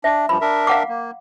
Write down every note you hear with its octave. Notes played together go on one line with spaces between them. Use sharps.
D4 E5
G2 F3 B5
D4 A#4 E5
F5 F#5 D6
A#3